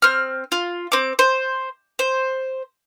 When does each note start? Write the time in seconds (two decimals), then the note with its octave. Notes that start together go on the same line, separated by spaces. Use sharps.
0.02 C4 F6
0.52 F4
0.92 C4 D6
1.19 C5
1.99 C5